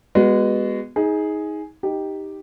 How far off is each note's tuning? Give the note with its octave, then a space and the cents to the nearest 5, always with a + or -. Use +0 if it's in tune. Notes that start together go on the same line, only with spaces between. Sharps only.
G#3 -20 B3 +0 F#4 +0
D#4 +25 G#4 +0
D#4 +0 G4 +0